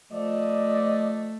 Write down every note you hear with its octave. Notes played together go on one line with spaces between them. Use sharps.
F3 A3 D5 D#5